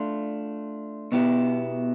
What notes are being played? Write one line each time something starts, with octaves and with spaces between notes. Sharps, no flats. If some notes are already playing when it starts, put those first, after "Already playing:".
Already playing: A3 D4 F4
B2 B3 E4 G4